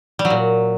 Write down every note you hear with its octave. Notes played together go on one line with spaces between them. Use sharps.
G3
F#3
A#2